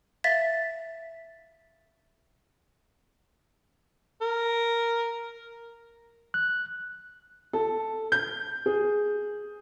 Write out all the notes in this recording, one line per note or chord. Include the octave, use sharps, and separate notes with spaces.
E5 F5 A6 B6
A#4
F#6
A4
G6
G#4